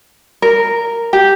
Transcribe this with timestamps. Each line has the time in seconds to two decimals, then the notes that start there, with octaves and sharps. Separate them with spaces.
0.42 A#4
1.13 G4